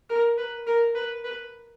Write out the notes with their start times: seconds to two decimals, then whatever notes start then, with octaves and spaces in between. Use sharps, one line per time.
0.09 A#4
0.38 B4
0.67 A#4
0.95 B4
1.24 B4